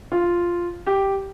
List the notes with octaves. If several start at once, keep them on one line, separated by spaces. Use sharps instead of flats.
F4
G4